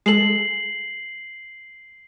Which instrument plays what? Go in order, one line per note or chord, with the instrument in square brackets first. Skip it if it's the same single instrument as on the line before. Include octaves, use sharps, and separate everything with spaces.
[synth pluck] G#3 A4 [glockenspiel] C7 F#7